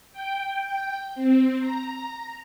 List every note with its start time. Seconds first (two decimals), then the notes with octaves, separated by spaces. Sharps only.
0.13 G5
1.15 C4
1.59 A#5